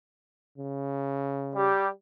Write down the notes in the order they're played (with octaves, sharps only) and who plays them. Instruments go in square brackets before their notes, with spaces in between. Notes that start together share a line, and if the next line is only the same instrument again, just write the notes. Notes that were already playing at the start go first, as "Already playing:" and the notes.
[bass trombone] C#3
[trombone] G3 [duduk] G4